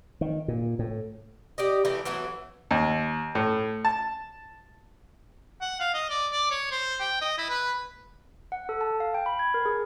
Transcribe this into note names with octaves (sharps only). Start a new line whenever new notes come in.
D#3
A#2
A2
G4 D5 D#5
E3 A3 G4 A#5
E3 F#3 A3 B3
D#2
A2
A5
F#5
F5
D#5
D5
D5
C#5
C5
G5
D#5
E4
B4
F#5
A4
A5
F5
G5
B5
G#6
A#4
G#4